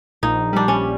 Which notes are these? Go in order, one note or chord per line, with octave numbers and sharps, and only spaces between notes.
A#1 D#4
G3 D4
C#4